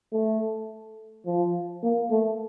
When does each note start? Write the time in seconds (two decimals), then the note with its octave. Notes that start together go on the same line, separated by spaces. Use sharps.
0.13 A3
1.26 F3
1.83 A#3
2.11 A3